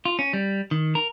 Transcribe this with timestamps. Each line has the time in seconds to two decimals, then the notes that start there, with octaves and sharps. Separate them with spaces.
0.05 F4
0.19 C#4
0.33 G3
0.71 D#3
0.95 A#4